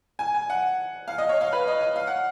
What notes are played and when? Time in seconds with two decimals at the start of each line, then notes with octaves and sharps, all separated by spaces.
0.19 G#5
0.34 G#5
0.50 F#5
1.08 F5
1.18 D#5
1.29 C#5
1.41 F5
1.53 B4
1.67 D#5
1.81 F5
1.96 F5
2.07 F#5